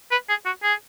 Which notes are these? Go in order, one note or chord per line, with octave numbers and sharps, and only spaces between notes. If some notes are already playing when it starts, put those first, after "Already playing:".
B4
G#4
F#4
G#4